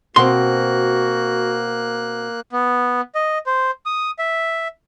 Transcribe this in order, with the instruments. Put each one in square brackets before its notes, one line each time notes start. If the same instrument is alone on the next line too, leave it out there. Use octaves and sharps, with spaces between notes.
[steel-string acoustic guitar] B2 C4 [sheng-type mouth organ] A#3 F#6 [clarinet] F#4 [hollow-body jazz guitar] C6
[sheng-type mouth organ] B3
D#5
C5
D#6
E5